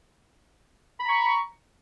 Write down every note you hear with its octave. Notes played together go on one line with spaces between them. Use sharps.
A#5 B5 C#6